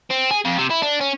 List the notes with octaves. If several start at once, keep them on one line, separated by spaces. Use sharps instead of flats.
C4
G#4
F2
C3
E4
D4
C#4